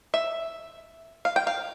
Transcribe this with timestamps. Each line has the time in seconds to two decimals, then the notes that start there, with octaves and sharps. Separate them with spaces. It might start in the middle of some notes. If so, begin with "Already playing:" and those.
0.14 E5
1.25 F5
1.36 G5
1.47 F5